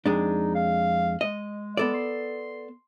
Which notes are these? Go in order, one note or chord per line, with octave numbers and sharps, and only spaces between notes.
F2 G#3 D4 D#4
F5
G#3 D#5
B3 A4 D5
C6